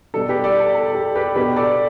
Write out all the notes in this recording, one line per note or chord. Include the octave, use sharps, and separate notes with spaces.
B2 G3 D4 A4
G4 B4
A4 D5
A4
A4
G4
G4 B4
B2 B3 D4 G4 B4
A4 D5